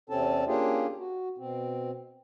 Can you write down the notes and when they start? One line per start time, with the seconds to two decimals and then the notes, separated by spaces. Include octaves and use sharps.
0.10 E2 C3 C4 C#4 A4 A5
0.47 A#3 C#4 D4 F4 G4 G#4
0.99 F#4
1.38 B2 C4